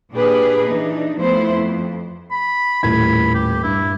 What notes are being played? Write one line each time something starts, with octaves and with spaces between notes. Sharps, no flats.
A#2 D4 G4 G#4 B4
E3 D4 D#4
F3 A3 B3 E4 C5
F2
B5
D#1 A2 B5 G#6
G4
G2 E4